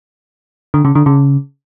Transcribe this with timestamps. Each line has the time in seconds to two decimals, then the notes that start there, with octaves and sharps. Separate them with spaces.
0.74 D3
0.85 C#3
0.95 D3
1.06 C#3